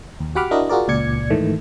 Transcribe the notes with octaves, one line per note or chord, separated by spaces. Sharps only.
D#2
F#4 G4 F#5 B5 D6 F6
D4 E4 F#4 A#4 D#5
F4 F#4 G#4 A#4 D5
C#2 A#2 D5 G#6 C#7
G#2 D#3 E3 A3